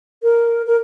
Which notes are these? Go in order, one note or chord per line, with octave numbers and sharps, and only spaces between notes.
A#4
A#4